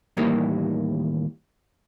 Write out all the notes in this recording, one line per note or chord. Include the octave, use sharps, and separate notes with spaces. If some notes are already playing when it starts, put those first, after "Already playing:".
D#2 A2 D#3 E3 G3 A#3